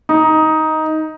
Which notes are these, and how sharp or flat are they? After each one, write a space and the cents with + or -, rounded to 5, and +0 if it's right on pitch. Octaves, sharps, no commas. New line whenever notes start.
D#4 +10